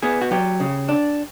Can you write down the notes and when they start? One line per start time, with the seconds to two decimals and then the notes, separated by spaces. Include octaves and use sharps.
0.02 B3 G#4
0.21 F#4
0.31 F#3 G4
0.60 C#3
0.89 D4